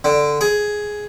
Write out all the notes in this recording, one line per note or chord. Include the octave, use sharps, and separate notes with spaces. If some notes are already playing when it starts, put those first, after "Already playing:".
D3
G#4